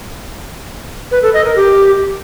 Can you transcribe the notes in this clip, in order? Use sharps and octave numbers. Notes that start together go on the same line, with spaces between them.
B4
A4
D#5
A#4
G4